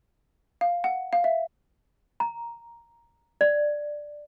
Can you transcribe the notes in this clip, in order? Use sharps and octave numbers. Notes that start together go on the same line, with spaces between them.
F5
F#5
F5
E5
A#5
D5